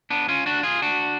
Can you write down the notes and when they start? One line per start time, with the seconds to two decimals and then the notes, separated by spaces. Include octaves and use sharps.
0.10 B3 D4
0.28 C#4 F4
0.46 D4 F#4
0.63 F4 G#4
0.82 D4 F#4